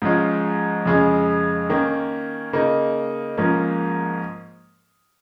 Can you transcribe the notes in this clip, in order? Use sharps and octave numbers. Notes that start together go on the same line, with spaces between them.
G#2 F3 G#3 C#4
F2 C#3 G#3 C#4
D#3 A#3 C#4
C#3 A#3 D#4
G#2 F3 A#3 C#4